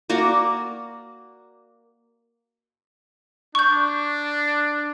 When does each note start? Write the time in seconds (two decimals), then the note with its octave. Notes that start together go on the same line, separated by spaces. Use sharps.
0.10 A#3 F#4 D5 A#5
3.55 D4 C#6 G6